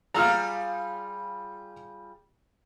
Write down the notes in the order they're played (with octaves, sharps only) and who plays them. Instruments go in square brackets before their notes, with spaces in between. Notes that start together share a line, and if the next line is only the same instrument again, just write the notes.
[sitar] G3 F4 G#4 [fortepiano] A#5 E6 F6